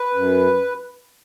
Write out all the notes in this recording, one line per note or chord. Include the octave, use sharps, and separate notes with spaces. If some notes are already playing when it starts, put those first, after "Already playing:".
Already playing: B4
F#2